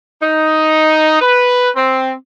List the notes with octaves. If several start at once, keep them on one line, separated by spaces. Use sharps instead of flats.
D#4
B4
C4